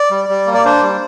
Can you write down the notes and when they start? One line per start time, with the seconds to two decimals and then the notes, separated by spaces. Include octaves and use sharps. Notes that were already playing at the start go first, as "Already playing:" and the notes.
Already playing: D5
0.11 G3
0.29 G3
0.47 A#3
0.54 D5
0.65 D4 C5
0.82 G3